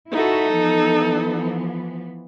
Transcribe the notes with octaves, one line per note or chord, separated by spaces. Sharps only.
D#4 E4 F#4 A4 E5
E3 F3 B3